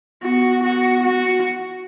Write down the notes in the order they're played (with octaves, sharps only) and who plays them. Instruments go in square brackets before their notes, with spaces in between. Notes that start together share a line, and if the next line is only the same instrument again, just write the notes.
[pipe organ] B3 [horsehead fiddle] F#4
[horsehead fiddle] F#4
F#4